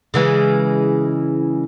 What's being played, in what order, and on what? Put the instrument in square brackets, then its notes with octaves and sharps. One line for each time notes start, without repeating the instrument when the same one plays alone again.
[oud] C#3 E3 G#3